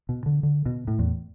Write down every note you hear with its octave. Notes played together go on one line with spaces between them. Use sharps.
B2
D3
D3
B2
A2
E2